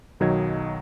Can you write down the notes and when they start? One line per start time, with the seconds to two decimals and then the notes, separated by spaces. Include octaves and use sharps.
0.20 B1 D#3 F#3 D#5 G#6